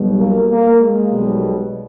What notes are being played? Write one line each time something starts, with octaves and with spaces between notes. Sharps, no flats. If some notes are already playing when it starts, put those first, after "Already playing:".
Already playing: B1 B2 G3
A#3
A#3
G#3
B1 B2 G3